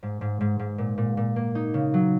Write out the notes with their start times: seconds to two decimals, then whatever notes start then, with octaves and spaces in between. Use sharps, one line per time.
0.03 G#2
0.21 G#2
0.41 G#2
0.59 G#2
0.78 A#2
0.98 A#2
1.17 A#2
1.36 A#3
1.55 D#4
1.74 C#3
1.94 F#3